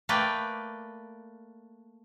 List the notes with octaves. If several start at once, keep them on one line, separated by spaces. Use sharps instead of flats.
A3 A#3 B4 D5 G5